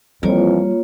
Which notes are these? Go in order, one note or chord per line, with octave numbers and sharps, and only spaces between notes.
F2 E3 G3 A#3 F4 C#5